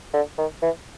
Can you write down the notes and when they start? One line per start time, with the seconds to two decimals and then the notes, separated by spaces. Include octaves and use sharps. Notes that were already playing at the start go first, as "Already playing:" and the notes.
0.14 D3
0.38 D#3
0.62 E3